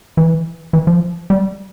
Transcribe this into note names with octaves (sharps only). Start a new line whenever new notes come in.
E3
E3
F3
G3